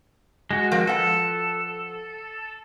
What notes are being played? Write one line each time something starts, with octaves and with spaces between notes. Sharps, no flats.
G#3 F#4
F3 C4 A#4
F3 A4 B4 F#5